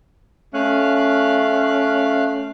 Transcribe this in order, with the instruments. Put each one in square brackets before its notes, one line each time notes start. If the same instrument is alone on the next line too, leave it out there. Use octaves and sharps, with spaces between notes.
[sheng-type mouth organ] A3 F5 F#6 [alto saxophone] C#4